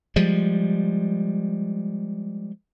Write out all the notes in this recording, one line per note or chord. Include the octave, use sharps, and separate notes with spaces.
F3 G3 G#3